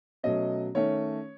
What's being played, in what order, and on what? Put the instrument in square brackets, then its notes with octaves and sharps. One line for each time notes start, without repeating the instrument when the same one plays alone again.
[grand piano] B2 F#3 A3 C#4 D#5
D#3 A3 C#4 C#5